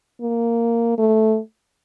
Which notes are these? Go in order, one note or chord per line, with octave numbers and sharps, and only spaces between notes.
A#3
A3